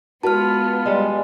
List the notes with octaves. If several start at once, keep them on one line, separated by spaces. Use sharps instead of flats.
G#3 B3 F4 F#4 B4 A5 F6
G3 G#3